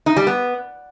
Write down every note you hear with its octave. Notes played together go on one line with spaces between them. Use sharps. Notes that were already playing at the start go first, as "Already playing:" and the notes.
D#4
G3
B3